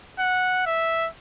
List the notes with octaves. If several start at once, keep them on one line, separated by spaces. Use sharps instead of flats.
F#5
E5